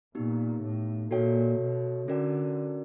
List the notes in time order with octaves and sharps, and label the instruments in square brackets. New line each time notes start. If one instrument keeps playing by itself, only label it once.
[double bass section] A#2 [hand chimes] B3 D#4 G4
[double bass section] A2
[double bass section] A#2 [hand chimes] F#4 A4 C#5 E5 G5
[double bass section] B2
[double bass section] D3 [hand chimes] C#4 F#4 A#4 D5 G5